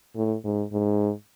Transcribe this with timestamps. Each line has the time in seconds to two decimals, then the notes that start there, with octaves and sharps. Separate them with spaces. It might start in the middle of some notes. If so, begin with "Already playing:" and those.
0.16 A2
0.45 G#2
0.73 G#2